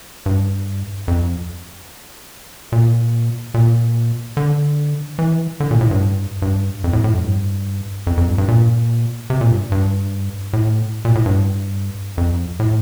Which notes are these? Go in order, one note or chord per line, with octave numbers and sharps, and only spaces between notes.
G2
F2
A#2
A#2
D3
E3
D3
A#2
A2
G2
G2
F2
A2
A2
F2
G2
F2
F2
G2
G2
A#2
C3
A#2
G2
G2
A2
A#2
A2
G2
F2
A2